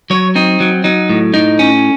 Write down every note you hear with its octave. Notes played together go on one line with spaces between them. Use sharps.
F#3 C#5
C4 D#4
F#3
F#3 D#4
A2
A2 D#4
C#4